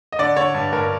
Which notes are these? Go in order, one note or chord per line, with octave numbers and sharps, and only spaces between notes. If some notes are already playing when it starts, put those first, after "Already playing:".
D#5
D3 D5
D3 C#5
G2
G2 A#4